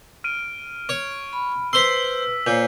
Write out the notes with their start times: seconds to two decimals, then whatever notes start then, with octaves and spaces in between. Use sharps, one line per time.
0.24 F6 D7 D#7
0.89 C#5
1.33 B5
1.73 B4 C5 C6 E6 B6
2.47 A#2 C5 C#5 G#5 G6